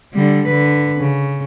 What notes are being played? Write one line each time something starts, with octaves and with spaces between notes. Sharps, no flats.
D3 G3
D3 B4
C#3